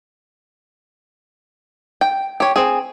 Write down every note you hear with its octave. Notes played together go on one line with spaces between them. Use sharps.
G5
G4 C#5
C4 G#4